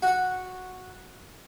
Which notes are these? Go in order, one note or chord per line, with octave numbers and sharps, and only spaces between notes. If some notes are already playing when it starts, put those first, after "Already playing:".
F#4 F#5